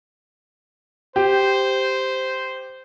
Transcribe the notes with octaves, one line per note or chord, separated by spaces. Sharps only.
G4 C5